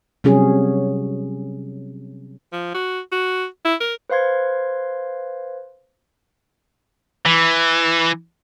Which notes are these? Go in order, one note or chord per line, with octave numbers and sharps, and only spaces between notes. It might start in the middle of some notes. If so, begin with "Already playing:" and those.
C3 F#3 G3 C#4 G#4
F3
F#4
F#4
E4
A#4
B4 C5 F5 C6 G#6
E3